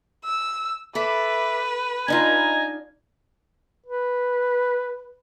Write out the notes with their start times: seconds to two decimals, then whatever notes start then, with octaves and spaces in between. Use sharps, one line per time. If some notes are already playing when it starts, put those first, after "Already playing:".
0.25 E6
0.95 A4 B4 E5 B5 D6
2.08 D4 D#4 F4 D#5 G#5 A#5
3.86 B4